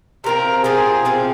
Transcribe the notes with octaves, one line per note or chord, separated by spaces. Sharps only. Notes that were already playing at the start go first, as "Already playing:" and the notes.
C3 F3 C4 F4 A#4
C3 F3 C4 F4 G#4
C3 F3 C4 F4